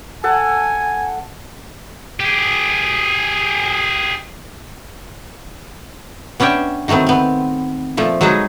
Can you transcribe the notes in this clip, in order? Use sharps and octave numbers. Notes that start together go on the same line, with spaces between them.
A4 F#5 G#5 A5
G4 G#4
B3 C#4 D4 E5 G5
D#3 F#3 A3 B3 C4
B3 C4
A#2 F3 A3
F#3 G#3 D#4 F#4 G#4 B4